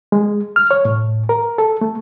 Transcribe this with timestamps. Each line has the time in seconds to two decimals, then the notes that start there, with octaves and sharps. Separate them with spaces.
0.12 G#3
0.56 F6
0.71 C#5
0.85 A2
1.29 A#4
1.58 A4
1.81 A3